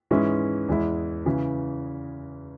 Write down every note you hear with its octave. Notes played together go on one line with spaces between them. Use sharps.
G#2 E3 G#3 C#4 E4
E2 E3 G#3 E4
C#3 E3